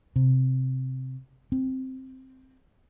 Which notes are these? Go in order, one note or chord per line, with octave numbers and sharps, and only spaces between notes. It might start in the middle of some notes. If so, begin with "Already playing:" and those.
C3
C4